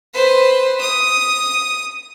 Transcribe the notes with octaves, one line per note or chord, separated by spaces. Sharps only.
B4 C5
D#6